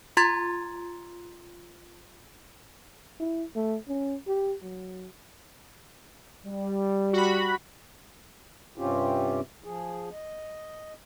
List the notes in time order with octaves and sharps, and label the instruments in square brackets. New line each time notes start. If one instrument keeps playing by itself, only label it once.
[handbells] F4 A#5 C6 G#6 A6
[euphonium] E4
A3
C#4
G4
F#3
[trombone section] G3
[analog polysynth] F#4 B5
[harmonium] G2 C3 C4 C#4 F4 G4
F3 G#4
D#5